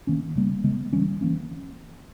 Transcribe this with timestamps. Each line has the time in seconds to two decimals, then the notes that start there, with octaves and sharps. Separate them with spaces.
0.07 D#3 A#3 C#4
0.36 C#3 G3 A#3
0.64 C#3 G#3 B3
0.93 E3 G3 C#4
1.21 E3 A#3 C#4